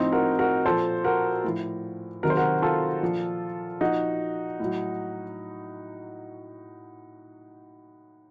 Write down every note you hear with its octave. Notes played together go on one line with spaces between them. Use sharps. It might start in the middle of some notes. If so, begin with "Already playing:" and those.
Already playing: A2 F3 C4 D#4
F#4 A#4
F#4 A#4
A#2 F3 A4 C5
F#4 A#4
A2 F3
C3 D#3 F#3 A#4
C5
F#4 A#4
F4 A4
A#2 F3
A#2 F3 D#4 F#4
A2 F#3